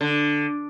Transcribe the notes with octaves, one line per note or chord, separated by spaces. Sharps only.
D3